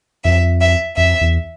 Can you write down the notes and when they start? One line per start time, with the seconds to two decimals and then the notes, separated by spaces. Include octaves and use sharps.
0.24 F2 E5
0.61 E5
0.97 F2 E5
1.21 E2